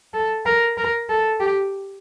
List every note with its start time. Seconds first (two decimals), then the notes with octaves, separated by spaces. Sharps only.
0.14 A4
0.46 A#4
0.78 A#4
1.09 A4
1.40 G4